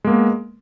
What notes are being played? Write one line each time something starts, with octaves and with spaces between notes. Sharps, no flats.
G#3 A#3 B3